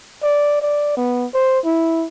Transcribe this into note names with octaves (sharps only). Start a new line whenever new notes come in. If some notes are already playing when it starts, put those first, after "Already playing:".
D5
D5
B3
C5
E4